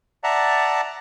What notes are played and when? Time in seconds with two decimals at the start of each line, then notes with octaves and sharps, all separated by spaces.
0.24 D5 E5 F#5 A5 A#5